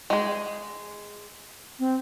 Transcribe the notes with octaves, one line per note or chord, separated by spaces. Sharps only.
G#3 G#4
C4